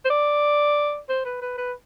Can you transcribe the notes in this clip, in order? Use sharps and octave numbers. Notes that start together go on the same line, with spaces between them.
C5
D5
C5
B4
B4
B4